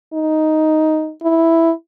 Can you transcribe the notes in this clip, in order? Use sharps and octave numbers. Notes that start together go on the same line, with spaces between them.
D#4
E4